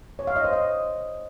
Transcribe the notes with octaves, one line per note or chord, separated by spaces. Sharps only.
C#5
F5
D#5
C5
D#5